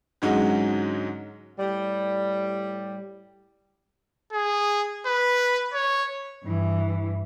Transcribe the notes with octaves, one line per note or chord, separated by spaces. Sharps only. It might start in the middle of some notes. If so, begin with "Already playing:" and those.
G#2 D3 F#3 G#3 C#4 F#4
A2 G3
G#4
B4
C#5
G2 E3